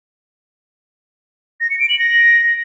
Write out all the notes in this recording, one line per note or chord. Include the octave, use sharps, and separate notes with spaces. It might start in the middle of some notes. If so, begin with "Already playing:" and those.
A#6
C#7
D7
F#7
A#6